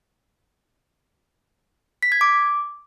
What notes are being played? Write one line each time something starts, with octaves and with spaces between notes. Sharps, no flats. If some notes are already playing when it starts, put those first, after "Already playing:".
B6
G#6
D6